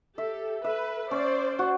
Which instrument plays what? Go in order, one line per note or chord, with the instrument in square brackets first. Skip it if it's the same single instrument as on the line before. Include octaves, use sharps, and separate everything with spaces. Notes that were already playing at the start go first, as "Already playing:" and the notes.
[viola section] G4 A4 [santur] E5
[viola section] A4 B4 [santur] E5
[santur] C#4 [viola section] C5 D5
[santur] F#4